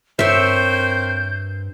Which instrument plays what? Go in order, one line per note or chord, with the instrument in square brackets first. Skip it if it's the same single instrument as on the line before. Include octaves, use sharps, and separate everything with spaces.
[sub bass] G2 [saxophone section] C4 A#4 C5 [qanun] C#5 E5 [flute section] G6